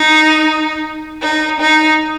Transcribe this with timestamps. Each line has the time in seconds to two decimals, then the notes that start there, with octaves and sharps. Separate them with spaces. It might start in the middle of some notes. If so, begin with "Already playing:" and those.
Already playing: D#4
1.22 D#4
1.61 D#4